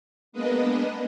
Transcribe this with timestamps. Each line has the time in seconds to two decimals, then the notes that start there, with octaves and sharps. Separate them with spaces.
0.32 G#3 A#3 B3 D4 B4 D#5